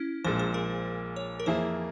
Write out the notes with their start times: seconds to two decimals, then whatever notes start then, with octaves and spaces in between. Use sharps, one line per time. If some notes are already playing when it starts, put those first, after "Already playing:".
Already playing: C#4 E4
0.24 A#1 A#2 G#3 C5
0.39 C5
0.54 A#4
1.16 C#5
1.40 A#4
1.46 F2 E3 A#3 E4 G#4 C5